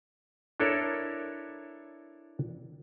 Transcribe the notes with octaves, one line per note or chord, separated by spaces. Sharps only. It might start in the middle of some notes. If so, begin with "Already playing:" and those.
D4 E4 A4 A#4 C#5